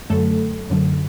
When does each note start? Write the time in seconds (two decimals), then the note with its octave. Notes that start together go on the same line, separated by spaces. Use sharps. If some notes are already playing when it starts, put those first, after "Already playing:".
0.10 F#2 D3 F#3 A3 A4
0.70 F#2 D3 F#3